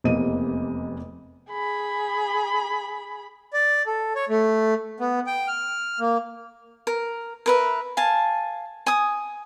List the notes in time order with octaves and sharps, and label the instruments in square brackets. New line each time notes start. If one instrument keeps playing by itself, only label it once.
[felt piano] F1 E2 C3 A#3 D#5 D#7
[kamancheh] G#4 B5
[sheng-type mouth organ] D5
A4
C#5
A3
B3
G5
F6
A#3
[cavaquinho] A#4
A#4 B4 E5
F5 G#5 A5
G#5 D#6